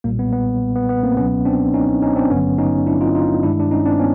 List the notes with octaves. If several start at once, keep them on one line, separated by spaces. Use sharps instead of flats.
B1 A#2 G3 A#3
B3
B3
B3
B3
A#3 C4
C#2 B2 F#3 B3 C#4
C4 D4
C#4 D#4
C#4 D#4
C4 D4
G#1 G2 D3 F#3 B3 C#4
C#4 D#4
D4 E4
D#4 F4
D#4 F4
G2 D#3 G#3 D4 E4
D4
C#4 D#4
C4 D4
B3 C#4